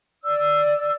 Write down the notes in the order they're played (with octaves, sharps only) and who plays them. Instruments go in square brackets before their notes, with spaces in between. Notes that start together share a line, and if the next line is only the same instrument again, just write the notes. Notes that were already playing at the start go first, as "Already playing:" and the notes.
[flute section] D5 E6